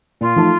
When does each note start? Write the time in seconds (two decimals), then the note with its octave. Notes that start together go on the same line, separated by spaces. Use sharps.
0.21 A#2 F4
0.36 F3 A3 D#4 A4